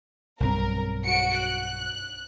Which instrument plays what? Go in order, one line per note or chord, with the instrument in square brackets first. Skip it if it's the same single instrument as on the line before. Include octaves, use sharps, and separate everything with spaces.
[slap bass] B1 G2 C4 [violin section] A#4
[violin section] F#4 C#7 D7
F#6